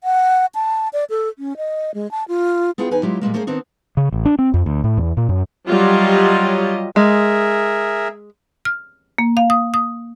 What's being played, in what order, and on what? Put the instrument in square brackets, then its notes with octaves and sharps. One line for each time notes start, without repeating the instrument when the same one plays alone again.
[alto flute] F#5
A5
D5
A4
C#4
D#5
G#3
A5
F4
[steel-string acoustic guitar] B3 E4 F4 G#4 F#5 G5
E2 D#4 B4 G5 G#5
F#3 G#3 E4 F4 G4
A#2 G3 G#3 A#3
A3 A#3 C#4 G#4 C5
D#3 B3 C4 D4 D#4
[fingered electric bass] C#3
A1
D4
C4
F2
D2
A2
E2
A#2
F#2
[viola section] F#3 G3 F4 G4 D#5
[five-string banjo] G#3 [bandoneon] G#4 A#4 E5
[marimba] F6
A#3
F5
D#6
D#6